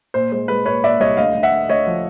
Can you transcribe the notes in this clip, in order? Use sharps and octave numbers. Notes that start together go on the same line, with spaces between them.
A#2 C5
G#3 C5
G#3 B4
A#2 B4 C#5
A#2 D5 E5
C2 C#5 D#5
D2 D#5 F5
D2
E5 F#5
D2
D2 C#5 D#5
F3